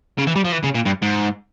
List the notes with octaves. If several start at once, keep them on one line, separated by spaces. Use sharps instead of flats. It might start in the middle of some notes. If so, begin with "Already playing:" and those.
C#3
E3
G3
F3
E3
C#3
A#2
G2
G#2